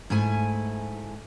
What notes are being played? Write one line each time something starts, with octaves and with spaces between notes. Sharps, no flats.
G#2 A3 E4 G#5